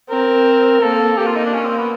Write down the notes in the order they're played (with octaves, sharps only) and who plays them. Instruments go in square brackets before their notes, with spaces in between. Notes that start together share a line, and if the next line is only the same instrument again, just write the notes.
[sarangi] C4 [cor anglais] A#4
[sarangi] A#3 [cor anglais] A4
[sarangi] A#3 [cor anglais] G4
[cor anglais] F4
D#4
D4
C#4
C4
B3